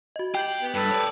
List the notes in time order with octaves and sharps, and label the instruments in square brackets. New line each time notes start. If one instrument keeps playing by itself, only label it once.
[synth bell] F#4 D#5
[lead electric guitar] G4 [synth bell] G5 G6 F#7
[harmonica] B3
[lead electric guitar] G2 [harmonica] A4 B4
[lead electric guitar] C#5 D5